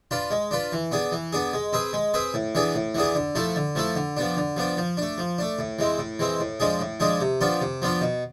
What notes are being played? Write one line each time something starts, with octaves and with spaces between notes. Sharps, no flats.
D4 F4 B4
G#3
D4 F4 B4
E3
B3 D4 G#4
E3
B3 D4 G#4
G#3
C4 G#4 B4
G#3
C4 G#4 B4
A2
E3 B3 D4 G#4
A2
E3 B3 D4 G#4
D3
F3 A3 E4 A4
D3
F3 A3 E4 A4
D3
F3 B3 D4
D3
F3 B3 D4
F3
A3 D4
F3
A3 D4
A2
E3 G#3 C4
A2
E3 G#3 C4
A2
F3 G#3 D4 G#4
A2
F3 G#3 D4 G#4
C3
F3 B3 D4 F4
C3
F3 B3 D4 F4
B2